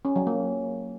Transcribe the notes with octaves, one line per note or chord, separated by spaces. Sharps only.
C#4
F#3
A#3